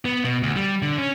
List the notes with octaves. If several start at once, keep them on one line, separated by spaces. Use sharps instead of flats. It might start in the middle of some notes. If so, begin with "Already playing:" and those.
B3
B2
D2
G3
D3
C#4